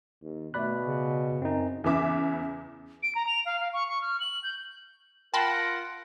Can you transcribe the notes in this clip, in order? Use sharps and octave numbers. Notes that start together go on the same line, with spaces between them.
D#2
B2 A3 D5 B5 F#6
C#3
F#2 C4 D#4
E2 C#3 E3 E5 D6
D7
A#5
F7
F5
F5
C#6
C#6
F6
F#7
G6
F4 A#4 F#5 G5 A5 B5 C6